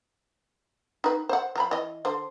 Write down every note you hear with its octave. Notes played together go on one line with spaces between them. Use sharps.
D#4 B4
C5 F#5
F3 A#5 B5
E3 D#5
D3 C5